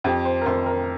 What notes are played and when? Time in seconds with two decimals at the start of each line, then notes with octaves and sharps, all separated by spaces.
0.04 F2 G4
0.25 C5
0.41 A#4
0.46 F2 C5
0.66 A#4